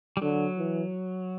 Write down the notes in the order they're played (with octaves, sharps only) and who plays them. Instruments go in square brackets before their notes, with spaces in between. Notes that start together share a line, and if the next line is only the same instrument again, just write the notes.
[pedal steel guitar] G3
[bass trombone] D3 [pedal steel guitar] F#3
[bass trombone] E3